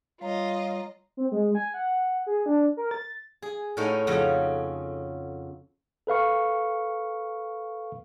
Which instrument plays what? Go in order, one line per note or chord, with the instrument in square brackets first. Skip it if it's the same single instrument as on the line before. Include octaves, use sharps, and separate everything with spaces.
[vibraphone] G3 C#5 A#5 [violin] F4 D#5 [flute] F5
[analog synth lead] C4
G#3
G#5
F#5
G#4
D4
A#4
A6
[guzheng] G#4
A2 C#4 D#4 F#4 D#5
F2 C#3 F#4 A#5
[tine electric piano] A4 B4 F5 C#6